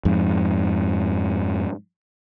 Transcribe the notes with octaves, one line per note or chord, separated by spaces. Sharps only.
F2 G#2